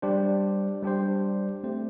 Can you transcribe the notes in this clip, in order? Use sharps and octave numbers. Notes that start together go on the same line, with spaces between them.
G3 D4 G4 C5
G3 D4 G4 C5
A3 C4 G4 C5